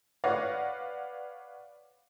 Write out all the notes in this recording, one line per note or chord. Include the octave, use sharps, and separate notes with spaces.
B4 C#5 D5 F5 F#5 A#6